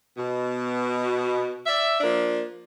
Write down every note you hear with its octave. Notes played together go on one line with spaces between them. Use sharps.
B2
D5 E5
F3 A#3 D4